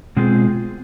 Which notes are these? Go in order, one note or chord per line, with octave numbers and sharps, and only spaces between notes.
B2 G#3 C4 F4 G#4